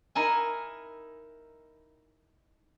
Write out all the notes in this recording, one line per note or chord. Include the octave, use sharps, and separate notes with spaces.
D#4 E4 A#4 G#5